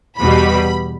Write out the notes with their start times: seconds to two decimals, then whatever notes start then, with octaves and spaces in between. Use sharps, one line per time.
0.18 E2 B2 G3 B5